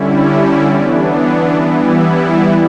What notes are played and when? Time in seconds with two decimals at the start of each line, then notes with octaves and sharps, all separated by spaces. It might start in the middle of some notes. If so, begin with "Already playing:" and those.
Already playing: D3 G3 C#4 E4
0.18 D5
0.65 E3 B3 D4 D5
1.12 C#5
1.58 E3 G3 B3 E4